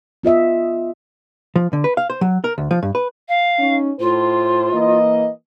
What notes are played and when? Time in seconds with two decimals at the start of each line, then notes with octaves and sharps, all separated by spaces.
0.23 B3 F4 D#5 E5
1.56 F3
1.73 D3
1.84 B4
1.97 F5
2.10 C5
2.21 F#3
2.44 A#4
2.58 D2
2.71 F3
2.83 G2
2.95 B4
3.28 F5
3.59 C#4 D#4
3.99 A2 F4 C5
4.73 E3 A#3 D#5